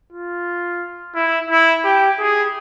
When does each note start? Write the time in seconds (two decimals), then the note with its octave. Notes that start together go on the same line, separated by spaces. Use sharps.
0.13 F4
1.15 E4
1.50 E4
1.84 G4
2.19 G#4